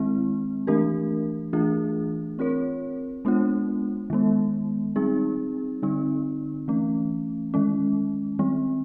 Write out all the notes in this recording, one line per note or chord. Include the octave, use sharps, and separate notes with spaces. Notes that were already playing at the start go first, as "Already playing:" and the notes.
Already playing: D#3 G#3 C4 E4
E3 A3 D4 G4 A#4
E3 A3 D4 F4 G#4
C4 F4 A#4 C#5
G#3 B3 D4 F4
D#3 G#3 B3
G3 C4 D#4 G#4
D3 G3 C4 D#4
E3 A3 C#4
D#3 G#3 C#4
D#3 G3 C4